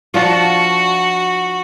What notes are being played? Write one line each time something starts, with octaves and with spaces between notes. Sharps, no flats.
F3 D4 F4 F#4